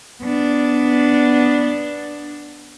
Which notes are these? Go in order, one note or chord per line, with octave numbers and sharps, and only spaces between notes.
B3 D4